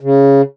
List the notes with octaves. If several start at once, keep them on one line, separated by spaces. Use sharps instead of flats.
C#3